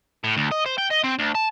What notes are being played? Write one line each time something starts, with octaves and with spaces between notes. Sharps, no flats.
A2
D2
D#5
C5
G5
D#5
C4
D2
A5